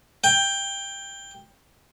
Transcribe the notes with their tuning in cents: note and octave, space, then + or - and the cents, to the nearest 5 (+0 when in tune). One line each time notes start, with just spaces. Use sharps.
G5 +10